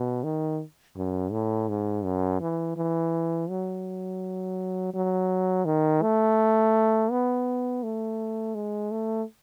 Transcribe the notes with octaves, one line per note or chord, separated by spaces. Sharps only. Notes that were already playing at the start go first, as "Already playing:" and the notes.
Already playing: B2
D#3
F#2
A2
G#2
F#2
E3
E3
F#3
F#3
D#3
A3
B3
A3
G#3
A3